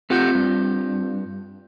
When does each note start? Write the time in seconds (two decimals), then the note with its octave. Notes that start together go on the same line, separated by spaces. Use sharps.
0.10 A3 C4 F4 G4 F#5 G6
0.35 G2